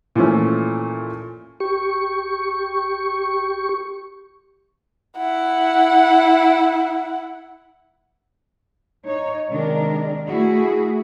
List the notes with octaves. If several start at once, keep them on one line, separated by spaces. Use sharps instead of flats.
A#2 E3 F3 A3 C#4
G4 C#6
E4 F#5
D#4 C#5
C3 D#3 G#3 D4 A#4
A3 E4 F#4 G#4